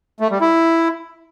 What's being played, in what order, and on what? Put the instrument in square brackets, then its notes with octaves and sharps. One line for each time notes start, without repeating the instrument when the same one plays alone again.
[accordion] A3
G3
E4